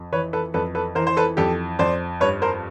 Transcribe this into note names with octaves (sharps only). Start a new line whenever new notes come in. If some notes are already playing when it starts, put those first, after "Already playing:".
Already playing: F2
E3 B4 C#5
A4 B4
F2 A4 B4
A4 B4
E3 A#4 C5
C5
A4 B4
F2 G4 A4
F2 C5 D5
G2 B4 C#5
A#4 C5